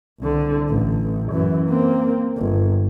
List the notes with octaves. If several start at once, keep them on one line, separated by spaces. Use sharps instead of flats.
C2 D3
A1
F#2 E3
A#3 C4
G1